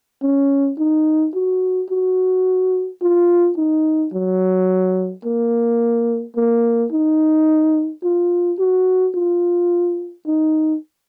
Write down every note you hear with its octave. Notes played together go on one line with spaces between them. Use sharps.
C#4
D#4
F#4
F#4
F4
D#4
F#3
A#3
A#3
D#4
F4
F#4
F4
D#4